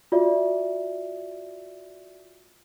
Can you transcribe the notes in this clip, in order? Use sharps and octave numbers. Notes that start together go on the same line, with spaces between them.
F4 F#4 D5 E5